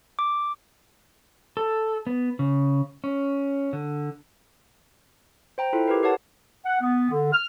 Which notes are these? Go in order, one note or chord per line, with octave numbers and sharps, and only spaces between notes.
D6
A4
B3
C#3
C#4
D3
C5 G5 A#5
E4 F4 A4
G4 A#4 B4
G4 B4 C#5 F#5 A5
F#5
B3
D3
F6